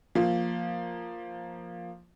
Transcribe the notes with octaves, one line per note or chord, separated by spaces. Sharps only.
F3 A#3